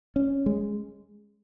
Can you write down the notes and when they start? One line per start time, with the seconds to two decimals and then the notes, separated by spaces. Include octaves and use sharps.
0.16 C#4
0.46 G#3